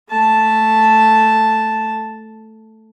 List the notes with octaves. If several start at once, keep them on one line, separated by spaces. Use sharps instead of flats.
A3 A5